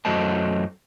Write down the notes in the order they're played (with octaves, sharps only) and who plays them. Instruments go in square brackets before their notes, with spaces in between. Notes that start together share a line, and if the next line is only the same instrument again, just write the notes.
[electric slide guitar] F#2 F#3 A3 C5 D#5 A5